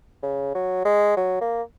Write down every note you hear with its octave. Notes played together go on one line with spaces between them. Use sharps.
C#3
F#3
G#3
F#3
A#3